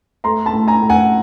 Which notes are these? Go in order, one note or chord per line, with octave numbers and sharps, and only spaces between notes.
A3 A#5 C6
A5 B5
A2
G#5 A#5
A2
F#5 G#5